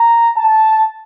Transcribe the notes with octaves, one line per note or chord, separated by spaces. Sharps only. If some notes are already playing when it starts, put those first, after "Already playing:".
Already playing: A#5
A5